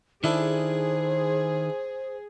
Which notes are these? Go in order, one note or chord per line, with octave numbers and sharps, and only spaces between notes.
D#3 D4 E4 G#4 A4 C5